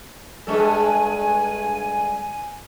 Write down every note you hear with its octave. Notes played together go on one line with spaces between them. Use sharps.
G2 G#3 A4 G#5